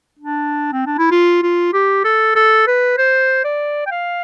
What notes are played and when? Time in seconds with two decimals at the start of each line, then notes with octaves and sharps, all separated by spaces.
0.19 D4
0.72 C4
0.86 D4
0.98 E4
1.11 F4
1.43 F4
1.73 G4
2.04 A4
2.36 A4
2.67 B4
2.98 C5
3.44 D5
3.86 G5
3.91 F5